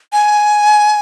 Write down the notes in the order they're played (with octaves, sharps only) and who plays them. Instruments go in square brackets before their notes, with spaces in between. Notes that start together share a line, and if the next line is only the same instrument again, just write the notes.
[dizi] G#5